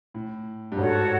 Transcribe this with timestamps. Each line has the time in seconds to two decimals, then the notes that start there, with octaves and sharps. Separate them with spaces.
0.14 A2
0.72 G2
0.77 G#2 F#4 A4 C#5 F#5